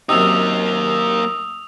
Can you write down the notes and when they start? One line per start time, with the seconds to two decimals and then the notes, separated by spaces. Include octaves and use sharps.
0.09 F#2 C3 A#3 D#4 D#6 E6 F7